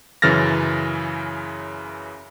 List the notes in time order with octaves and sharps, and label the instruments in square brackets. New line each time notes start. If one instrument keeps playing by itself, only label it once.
[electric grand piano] F#2 C#3 E3 F6 A6 A#6